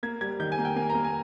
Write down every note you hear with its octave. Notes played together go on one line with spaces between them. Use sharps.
A#3 G#6
G3 G#6
D#3 G6
G#5
A#3
G5
A#3 G#5
A#5
A#3
G#5